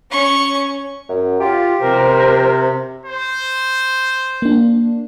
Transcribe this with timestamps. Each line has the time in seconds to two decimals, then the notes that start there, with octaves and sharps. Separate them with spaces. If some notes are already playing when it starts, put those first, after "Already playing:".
0.11 C#4 C#6
1.09 F#2
1.40 F4 G4
1.81 C3 A#4 C5
3.06 C5
4.42 A#3 D4